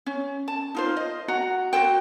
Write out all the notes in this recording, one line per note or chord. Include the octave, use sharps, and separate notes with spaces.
C#4
A5
D#4 F4 C5
D#5
F#4 F#5 A#5
F#4 G#4 C5 G5